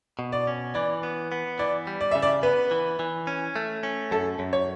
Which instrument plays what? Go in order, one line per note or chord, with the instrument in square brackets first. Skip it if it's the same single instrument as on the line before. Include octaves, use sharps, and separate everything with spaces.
[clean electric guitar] B2
[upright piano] D5
[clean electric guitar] C#4
[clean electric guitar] E3 [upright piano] D5
[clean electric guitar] B3
B3
[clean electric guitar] E3 [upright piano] D5
[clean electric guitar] G3
[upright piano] D5
[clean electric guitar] C#3 [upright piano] E5
[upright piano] D5
[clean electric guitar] B3 [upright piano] B4
[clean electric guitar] E3
E3
C#4
A3
C#4
[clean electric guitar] F#2 [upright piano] A4
[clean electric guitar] F#2
[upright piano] C#5